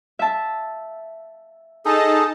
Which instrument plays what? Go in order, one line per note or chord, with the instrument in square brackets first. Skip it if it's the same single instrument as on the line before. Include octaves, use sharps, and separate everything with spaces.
[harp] E5 A5
[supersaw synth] D#4 D#5 A5 [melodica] G#4 A4